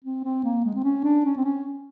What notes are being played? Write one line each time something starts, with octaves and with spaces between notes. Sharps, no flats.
C4
C4
A#3
G#3
C4
C#4
D4
C#4
C4
C#4